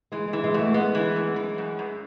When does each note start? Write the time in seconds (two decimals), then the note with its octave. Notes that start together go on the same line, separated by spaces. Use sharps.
0.12 E3 G#3
0.28 G#3
0.33 E3
0.44 G#3
0.54 F#2 A3
0.74 G#3 B3
0.95 E3
1.16 F#2
1.36 E3
1.58 F#2
1.79 F#2